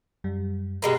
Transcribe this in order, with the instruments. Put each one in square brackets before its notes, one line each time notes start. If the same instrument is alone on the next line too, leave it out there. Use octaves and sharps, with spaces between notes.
[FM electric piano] F#2 G3
[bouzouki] B2 G#3 A#3 [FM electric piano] G4 B5